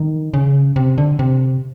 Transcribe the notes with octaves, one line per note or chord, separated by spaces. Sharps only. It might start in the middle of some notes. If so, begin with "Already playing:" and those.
Already playing: D#3
C#3
C3
D3
C3